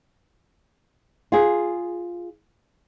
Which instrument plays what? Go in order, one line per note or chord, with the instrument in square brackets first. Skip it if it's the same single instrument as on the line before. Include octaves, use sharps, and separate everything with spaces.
[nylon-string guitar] F4 G#4